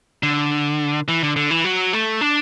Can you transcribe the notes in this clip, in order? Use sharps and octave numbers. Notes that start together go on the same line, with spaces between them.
D3
E3
D3
D3
E3
F#3
A3
D4